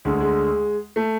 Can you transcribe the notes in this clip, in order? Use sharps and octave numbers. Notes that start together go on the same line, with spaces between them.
D2 D3 G#3
G#3
A3